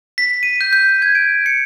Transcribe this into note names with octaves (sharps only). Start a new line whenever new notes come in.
B6
D#7
G6
G6
G#6
D7
C#7